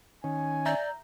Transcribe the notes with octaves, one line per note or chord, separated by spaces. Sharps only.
D#3 C#4 G#5
D5 E5 A#5 G6